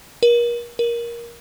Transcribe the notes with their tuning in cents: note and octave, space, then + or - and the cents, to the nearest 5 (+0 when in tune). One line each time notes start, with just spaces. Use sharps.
A#4 +35
A#4 +15